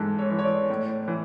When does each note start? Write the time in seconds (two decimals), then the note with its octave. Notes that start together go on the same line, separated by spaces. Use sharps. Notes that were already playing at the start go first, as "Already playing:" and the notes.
Already playing: G#2 E3 A4
0.19 C#5
0.31 E3
0.39 C#5
0.44 D5
0.70 A2
1.08 E3